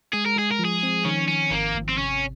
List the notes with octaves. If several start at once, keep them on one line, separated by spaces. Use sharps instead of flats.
G#3 G#4
A#4
G#3 G#4
A#4
F3
G#4
C4
D#3 C#4
D#3 C#4
G#1 A#3
G#1
C4
C3 C#4